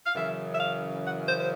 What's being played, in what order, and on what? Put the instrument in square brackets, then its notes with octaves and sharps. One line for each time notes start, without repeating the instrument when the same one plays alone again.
[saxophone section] F5
F#2 C#3 E3 E5
E5
F5
F#5
C5
C5